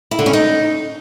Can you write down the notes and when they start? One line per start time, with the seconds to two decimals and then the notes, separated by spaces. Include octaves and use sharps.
0.11 E4
0.19 D3
0.26 C#4
0.33 D#4